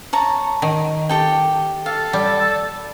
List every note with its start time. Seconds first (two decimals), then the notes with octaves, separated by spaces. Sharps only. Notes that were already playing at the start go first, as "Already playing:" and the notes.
0.13 C#5 A5 A#5
0.62 D#3
1.09 G4 A4 G5
1.86 A4 F5
2.13 G3